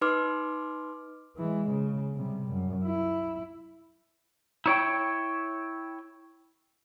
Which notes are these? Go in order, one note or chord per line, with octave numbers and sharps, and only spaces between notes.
D#4 B4 C6 D6 F6
E3 G#3
C#3
C3 G3
F#2
E4
E4 C#5 G5